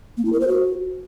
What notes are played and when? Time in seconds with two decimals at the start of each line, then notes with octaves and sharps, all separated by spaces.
0.17 A#3
0.25 E4
0.33 A#4
0.40 C5
0.48 F#4